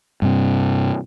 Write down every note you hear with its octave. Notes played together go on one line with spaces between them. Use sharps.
G2 C3